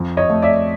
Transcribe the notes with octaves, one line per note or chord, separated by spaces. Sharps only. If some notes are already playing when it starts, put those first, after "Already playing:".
Already playing: F2 C4
C#5 D#5
A3
D5 E5